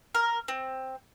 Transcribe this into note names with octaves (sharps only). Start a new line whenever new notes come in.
A#4
C4